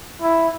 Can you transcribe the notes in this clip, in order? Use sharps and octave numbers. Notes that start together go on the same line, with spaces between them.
E4